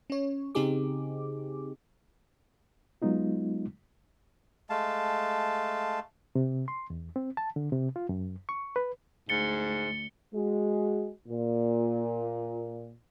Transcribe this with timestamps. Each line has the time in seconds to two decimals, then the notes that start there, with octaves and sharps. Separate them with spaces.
0.10 C#4 C#5
0.55 C#3 C4 D#4 G4 G#4 D6
3.02 F#3 G#3 B3 D#4 F4
4.70 G#3 A3 F5 A5
6.35 C3
6.68 C6
6.90 E2
7.16 C4
7.37 A5
7.56 D3
7.72 C3
7.96 F4
8.09 F#2
8.49 C#6
8.76 B4
9.29 D2 G#2 A6 C#7 G7
10.33 G#3 F#4
11.28 A#2